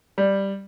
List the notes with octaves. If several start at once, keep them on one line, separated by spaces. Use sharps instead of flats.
G3